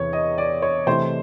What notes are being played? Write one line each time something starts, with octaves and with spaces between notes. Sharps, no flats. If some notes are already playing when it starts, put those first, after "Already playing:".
Already playing: E2 C3 E3 C#5
D#5
D5
C#5
C3 E3 A3 C5